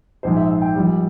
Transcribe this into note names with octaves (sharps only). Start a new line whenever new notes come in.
A#1 G#2 F3 G#3 C5
E5
E5
G5
A#1 A#2 G3